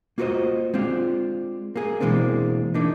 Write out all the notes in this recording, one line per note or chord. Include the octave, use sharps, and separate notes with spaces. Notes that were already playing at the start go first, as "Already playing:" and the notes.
A#3 F4 F#4 A#4 C5 D#5
G#3 C4 D4 F4
A#3 G#4
B2 E3 G#3 A#3 C4 D4
E3 A#3 D4 D#4